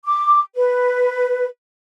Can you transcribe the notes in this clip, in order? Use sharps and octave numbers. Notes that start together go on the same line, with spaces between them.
D6
B4